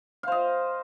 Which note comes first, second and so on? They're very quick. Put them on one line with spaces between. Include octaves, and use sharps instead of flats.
F5 C5 D#5